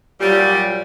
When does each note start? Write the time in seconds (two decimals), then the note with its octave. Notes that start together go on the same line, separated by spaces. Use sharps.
0.21 A#2 F#3 G3